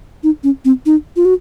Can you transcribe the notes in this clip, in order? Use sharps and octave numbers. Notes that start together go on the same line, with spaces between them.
D#4
C#4
C4
D#4
F4
F#4